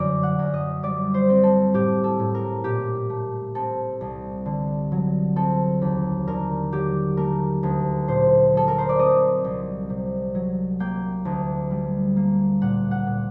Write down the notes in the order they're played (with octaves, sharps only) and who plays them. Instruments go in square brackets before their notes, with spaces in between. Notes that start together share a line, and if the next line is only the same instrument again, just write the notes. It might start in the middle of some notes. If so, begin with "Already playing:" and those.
Already playing: [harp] F#2 D3 F#3 D5
F#5
F#2
D#5
G3 D5
C5
C4
A4
A2 G4
A4
A2
A#4
A#2 G4
A3
C4 A4
C2
D3
F#3
C4 A4
D#2
D3 A#4
F#3 G4
A3 A#4
D2
A#2 C5
F#3 A4
A#4
C5
D5
C4 D#5
C2
C3
F#3
A#3 G5
D2
G3
A#3
A#2 F#5
F#5
A#2